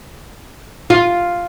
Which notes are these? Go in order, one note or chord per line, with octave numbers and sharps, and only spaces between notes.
F4